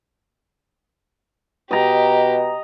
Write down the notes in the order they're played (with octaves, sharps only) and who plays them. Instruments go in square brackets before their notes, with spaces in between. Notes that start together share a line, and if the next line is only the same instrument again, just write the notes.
[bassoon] B2 [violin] G4 [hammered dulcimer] D#5 A#5